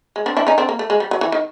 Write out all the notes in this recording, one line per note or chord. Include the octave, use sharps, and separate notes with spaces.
G#3
C4 D4
D4 E4
C#4 D#4
C4 D4
A#3
A3
G#3
G3
F#3
E3
D#3